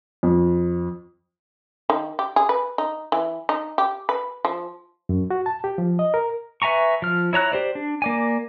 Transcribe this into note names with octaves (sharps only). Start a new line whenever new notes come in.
F2
D#3
G4
G#4
B4
D#4
E3
D#4
G4
B4
F3
F#2
F#4
A5
G4
F3
D#5
A#4
B4 E5 G#5 A#5 C#6
F3 F6
E4 C#5 A#5 F#6
G4 C5 D5
D4
A#3 D5 G#5